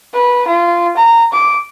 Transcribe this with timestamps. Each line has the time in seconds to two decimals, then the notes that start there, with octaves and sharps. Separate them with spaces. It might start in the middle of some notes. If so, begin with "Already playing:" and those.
0.14 B4
0.47 F4
0.97 A#5
1.32 D6